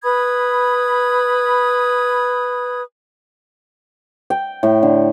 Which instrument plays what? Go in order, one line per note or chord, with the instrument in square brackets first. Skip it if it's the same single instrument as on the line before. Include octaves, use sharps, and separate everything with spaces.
[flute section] B4 B5 D#6 G#6
[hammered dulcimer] G5
A2
D3